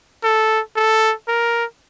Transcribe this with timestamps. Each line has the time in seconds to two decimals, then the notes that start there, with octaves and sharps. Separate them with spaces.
0.23 A4
0.76 A4
1.28 A#4